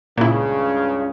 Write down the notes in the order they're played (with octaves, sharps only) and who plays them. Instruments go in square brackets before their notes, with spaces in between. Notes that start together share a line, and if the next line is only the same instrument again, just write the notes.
[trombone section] C#2 G2 C#3 [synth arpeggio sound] A#2 E4